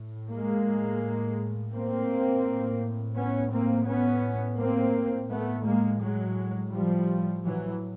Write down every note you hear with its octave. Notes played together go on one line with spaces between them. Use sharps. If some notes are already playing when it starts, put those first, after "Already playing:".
Already playing: A2
G#3 A#3
A#3 C4
A2
B3 C#4
A#3 C4
B3 C#4
A#3 C4
A2 A3 B3
G#3 A#3
F#3 G#3
F3 G3
E3 F#3